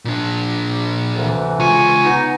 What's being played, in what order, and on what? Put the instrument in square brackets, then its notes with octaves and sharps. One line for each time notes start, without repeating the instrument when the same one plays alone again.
[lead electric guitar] A#2 D4
[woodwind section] D2 C3 E3
[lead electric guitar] C#2 F4 [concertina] G#5 C#6
[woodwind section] B3 D#4